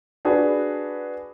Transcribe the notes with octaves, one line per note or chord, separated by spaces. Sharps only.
D4 F#4 G#4 B4